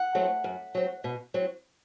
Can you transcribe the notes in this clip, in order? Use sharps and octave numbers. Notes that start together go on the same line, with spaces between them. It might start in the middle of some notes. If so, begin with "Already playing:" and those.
Already playing: F#5
F#3 A3 C4
F#2
F#3 C4
B2
F#3 C4